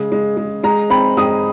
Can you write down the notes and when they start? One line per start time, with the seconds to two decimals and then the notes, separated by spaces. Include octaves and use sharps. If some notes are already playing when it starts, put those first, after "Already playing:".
Already playing: C#3 G#3
0.12 G#3
0.37 G#3
0.63 G#3 A#5
0.90 C4 B5
1.17 G#3 D#6